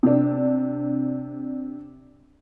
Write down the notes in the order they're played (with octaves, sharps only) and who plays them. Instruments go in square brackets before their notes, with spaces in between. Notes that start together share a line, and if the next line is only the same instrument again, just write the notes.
[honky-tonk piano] C3 D4